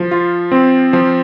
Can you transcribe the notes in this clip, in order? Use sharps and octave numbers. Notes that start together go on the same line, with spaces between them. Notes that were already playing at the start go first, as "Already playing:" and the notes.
Already playing: F3
F4
C4
F3